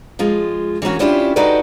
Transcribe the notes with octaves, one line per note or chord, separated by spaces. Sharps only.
F3 G#3 F4
E3 G3 A#3 C#4 F#4
B3 C#4 D4 E4 F4 G4
D#4 F#4 G4 A4 B4 D5